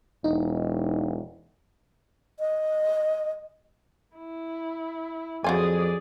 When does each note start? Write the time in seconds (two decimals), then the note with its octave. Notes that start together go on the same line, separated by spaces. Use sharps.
0.24 E1 D#4
2.39 D#5
4.16 E4
5.44 F2 F#3 F4 G#4 D5 G#5